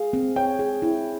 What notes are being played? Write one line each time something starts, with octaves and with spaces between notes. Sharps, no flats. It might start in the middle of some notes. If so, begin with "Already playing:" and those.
Already playing: G#4 F5
C4
C#5 G5
G#4
E4